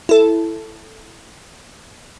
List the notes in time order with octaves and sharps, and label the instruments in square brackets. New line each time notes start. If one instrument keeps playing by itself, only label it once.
[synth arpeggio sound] E4 A4